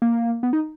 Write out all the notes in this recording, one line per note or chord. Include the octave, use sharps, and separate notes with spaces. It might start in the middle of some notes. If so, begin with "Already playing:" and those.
A#3
B3
D#4